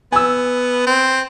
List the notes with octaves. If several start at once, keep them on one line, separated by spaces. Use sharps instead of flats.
B3 G#5 E6
C4